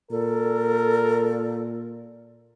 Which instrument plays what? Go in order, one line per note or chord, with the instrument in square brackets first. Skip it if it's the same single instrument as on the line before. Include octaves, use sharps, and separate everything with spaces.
[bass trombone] A#2 [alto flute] A4 [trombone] A#4